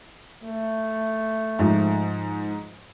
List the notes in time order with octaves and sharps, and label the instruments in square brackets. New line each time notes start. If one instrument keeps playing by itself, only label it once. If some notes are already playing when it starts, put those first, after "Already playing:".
[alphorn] A3
[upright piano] G#2 F3